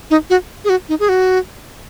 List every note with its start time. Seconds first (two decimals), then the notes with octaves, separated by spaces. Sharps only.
0.11 D#4
0.30 F#4
0.64 G#4
0.69 F#4
0.89 D#4
1.00 G#4
1.09 F#4